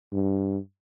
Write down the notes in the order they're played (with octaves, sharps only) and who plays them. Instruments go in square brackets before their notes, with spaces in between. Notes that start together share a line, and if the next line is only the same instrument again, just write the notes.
[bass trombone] G2